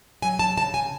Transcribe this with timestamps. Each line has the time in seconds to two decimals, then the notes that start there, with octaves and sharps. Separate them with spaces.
0.22 F#3 G#5
0.39 A5
0.57 C#3 A5
0.74 G#5